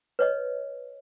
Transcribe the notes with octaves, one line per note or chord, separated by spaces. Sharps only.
B4 C#5 D#5